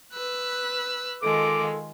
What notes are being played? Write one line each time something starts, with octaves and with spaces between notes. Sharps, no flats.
B4 E6 F#6
D#3 G#3 F4 A4 D6